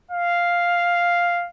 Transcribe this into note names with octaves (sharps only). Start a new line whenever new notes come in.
F5